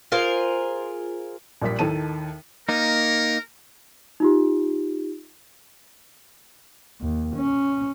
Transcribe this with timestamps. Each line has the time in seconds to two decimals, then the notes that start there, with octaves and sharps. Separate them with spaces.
0.12 F4 G#4 A#4 C5
1.62 A#1 A#2 G3 B6
1.79 D#2 A2 D#3 A4 A5 D#7
2.69 A#3 D#4 A#4
4.20 D#4 F4 G4
7.01 D#2
7.36 C#4